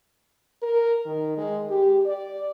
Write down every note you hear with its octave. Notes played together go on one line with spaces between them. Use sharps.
A#4
D#3
G#3
G4
D5